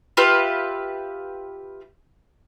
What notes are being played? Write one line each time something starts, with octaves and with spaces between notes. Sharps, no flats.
F4 G4 B4 E5